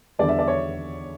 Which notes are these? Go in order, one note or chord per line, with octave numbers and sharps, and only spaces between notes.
E2 D3 G3 B3 D5
E5
D5
C#5